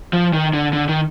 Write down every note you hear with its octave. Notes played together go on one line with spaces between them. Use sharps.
F3
D#3
D3
D3
D#3